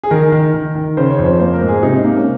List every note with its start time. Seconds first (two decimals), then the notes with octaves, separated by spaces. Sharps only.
0.03 G#4
0.10 D#3 A#4
0.32 D#3
0.54 D#3
0.75 D#3
0.97 C#3 C5
1.10 C#5
1.19 F2
1.25 C5
1.40 A#3 C5
1.53 A#4
1.61 G#2
1.68 G#4
1.83 C3 D#4
1.96 D#4
2.04 A#3
2.17 C#4